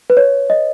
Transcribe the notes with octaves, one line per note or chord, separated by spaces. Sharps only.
B4
C#5
D#5